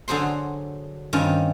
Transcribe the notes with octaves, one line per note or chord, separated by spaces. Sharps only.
D3 F#3 G#4 C5 C6
G2 D#3 C4 C#4 F4